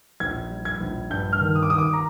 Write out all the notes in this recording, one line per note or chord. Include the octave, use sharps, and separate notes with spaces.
A#1 G#6
G3
G#6
A#1
G2 G6
F6
D#3
D#6
D6
D#3 D#6
D6
A#5